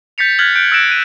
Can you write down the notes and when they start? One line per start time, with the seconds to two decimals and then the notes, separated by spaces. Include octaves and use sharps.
0.18 G6 A6 B6 C#7 F7
0.39 F6 F#6 G#6 A6 B6 F#7
0.55 F#6 G6 D7
0.72 E6 F#6 A6 A#6 D7 E7
0.89 F#6 D#7